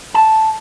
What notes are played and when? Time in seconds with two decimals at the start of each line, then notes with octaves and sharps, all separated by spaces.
0.14 A5